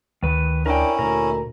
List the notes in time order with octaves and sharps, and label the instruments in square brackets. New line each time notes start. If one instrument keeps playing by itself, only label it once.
[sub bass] D2 [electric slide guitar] D#3 B4
[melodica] C#4 E4 [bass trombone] D4 [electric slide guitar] A#4 G5
[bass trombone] D2 [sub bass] A#2 [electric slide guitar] A#4